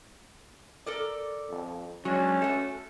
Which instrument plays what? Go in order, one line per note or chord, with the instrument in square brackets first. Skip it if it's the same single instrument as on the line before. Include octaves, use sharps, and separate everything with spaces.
[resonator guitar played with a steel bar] A4 A#4 D5
[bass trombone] F2
[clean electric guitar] F#3 G#3 D4 [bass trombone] C#4 [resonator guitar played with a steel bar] F#4
[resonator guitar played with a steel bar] A3 F#4 [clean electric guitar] A4